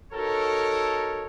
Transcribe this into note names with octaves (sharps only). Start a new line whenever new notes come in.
D#4 F#4 A4 A#4 C#5